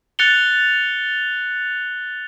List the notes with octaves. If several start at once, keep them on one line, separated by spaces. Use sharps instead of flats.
F#6 A6 C#7 F7 G7